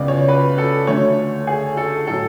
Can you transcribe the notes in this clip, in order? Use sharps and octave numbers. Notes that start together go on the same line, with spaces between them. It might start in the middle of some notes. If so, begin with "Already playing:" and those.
Already playing: C#2 C#3 G#3 B3 D5
C#5
B4
A4
D2 D3 A3 C#5
G#4
A4
A2 F#3 A4